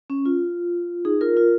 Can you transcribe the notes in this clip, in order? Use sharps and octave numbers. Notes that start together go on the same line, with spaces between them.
C#4
F4
D#4 G#4
F4 A#4
F4 A#4